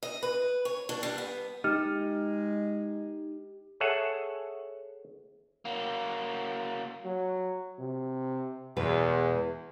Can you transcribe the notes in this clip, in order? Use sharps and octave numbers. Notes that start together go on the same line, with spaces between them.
D#5
B4
C#5
D4
G3
B3
G#3 D#4 G4 F6
G#4 A4 C#5 E5 F#5
F#3 A#3
F#3
C3
E2 B2 G#3 B4